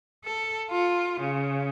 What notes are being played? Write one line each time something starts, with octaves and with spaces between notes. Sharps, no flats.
A4
F4
C#3